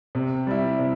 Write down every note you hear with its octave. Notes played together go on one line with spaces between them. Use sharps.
C3
G3 E4
C3